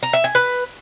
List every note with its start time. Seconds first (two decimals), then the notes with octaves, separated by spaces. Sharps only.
0.03 A#5
0.13 E5
0.24 G#5
0.35 B4